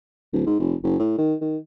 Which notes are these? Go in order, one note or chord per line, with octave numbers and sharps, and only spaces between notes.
D1
G#2
F1
F#1
A2
D#3
D#3